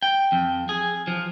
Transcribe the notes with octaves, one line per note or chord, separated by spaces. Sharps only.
G5
F2
G#4
F3